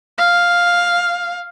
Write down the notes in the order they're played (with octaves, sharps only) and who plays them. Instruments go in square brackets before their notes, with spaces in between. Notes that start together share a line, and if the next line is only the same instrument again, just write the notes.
[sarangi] F5